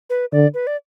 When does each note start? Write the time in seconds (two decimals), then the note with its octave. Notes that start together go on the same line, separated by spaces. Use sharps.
0.10 B4
0.32 D3 D5
0.54 B4
0.67 D5